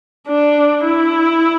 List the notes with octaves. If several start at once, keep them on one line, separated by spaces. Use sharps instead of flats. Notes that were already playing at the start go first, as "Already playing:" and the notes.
D4
E4